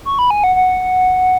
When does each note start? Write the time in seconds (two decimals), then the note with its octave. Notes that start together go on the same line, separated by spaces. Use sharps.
0.05 C#6
0.19 B5
0.30 G#5
0.44 F#5
0.55 F#5